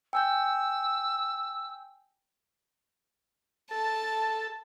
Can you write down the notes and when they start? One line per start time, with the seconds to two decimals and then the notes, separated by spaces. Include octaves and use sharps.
0.13 G5 G#5 E6 G6
3.71 A4 A5